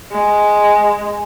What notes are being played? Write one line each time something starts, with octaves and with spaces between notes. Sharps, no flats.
G#3